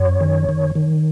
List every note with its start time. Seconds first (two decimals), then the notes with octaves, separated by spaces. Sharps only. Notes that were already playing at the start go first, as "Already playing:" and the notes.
Already playing: F#2 C#5
0.21 D#3
0.49 D#3
0.75 D#3